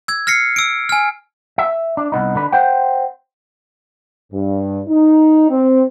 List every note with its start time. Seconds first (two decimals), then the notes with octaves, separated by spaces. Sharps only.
0.08 E6 G#6
0.27 F6 A#6 C7 C#7
0.56 E6 D7
0.89 G#5 F6
1.58 E5
1.97 D4
2.12 C2 B3 D#4
2.35 D3 D4 B4
2.52 C5 F#5 G5
4.32 G2
4.87 D#4
5.49 C4